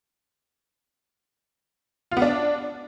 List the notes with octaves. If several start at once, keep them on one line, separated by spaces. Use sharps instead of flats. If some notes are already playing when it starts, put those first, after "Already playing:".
F4
B3
D4